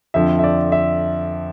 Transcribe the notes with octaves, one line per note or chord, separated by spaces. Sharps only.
F2 D3 F3 E5
E5
D5
E5